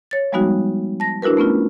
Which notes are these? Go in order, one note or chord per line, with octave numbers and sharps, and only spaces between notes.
C#5 A6
F3 G3 G#3 B3 D#4 F#4
A5 A#6
D4 E4 F#4 A#4 B4
A3 B3 C#4 F4